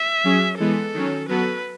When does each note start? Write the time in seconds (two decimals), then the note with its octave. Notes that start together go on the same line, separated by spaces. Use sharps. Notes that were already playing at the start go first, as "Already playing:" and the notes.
Already playing: E5
0.24 F#3 C#4 G#4
0.59 E3 G#3 B3 A4
0.94 D#3 F#3 C#4
1.28 F#3 B3 F#4 A4 B4